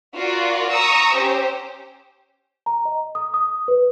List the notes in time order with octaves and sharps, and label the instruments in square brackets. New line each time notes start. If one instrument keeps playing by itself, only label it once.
[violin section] F4 F#4 A#4 D5
A#5 C#6 D#6 E6
C#4 G4 C5
[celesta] A#5
D#5
D#6
D#6
B4